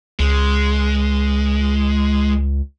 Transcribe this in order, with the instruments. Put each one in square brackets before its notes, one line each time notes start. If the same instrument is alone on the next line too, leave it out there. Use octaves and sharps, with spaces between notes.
[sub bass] C#2 [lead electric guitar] G#3